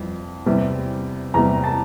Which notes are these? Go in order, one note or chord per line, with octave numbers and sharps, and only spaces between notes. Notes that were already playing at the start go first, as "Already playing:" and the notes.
Already playing: F2 E3 G3
E2 C3 G3
E2 C3 G3 A#5
A5